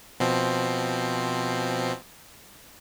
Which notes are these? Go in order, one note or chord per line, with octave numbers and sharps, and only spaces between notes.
B2 F3 C4